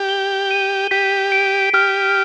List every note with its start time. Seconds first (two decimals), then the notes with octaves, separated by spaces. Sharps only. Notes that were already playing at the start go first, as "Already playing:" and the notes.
Already playing: G4
0.09 G7
0.51 D#7
0.91 G4 B6
1.32 D7
1.74 G4 F6